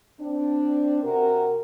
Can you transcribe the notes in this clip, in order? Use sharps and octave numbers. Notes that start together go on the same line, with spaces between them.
C4 D4
C3 F#4 A#4